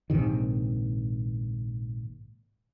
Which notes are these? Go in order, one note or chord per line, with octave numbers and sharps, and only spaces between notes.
A#1 G#2 C3 D#3